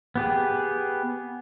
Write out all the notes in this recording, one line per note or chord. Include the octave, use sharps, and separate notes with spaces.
B3 G4 G#4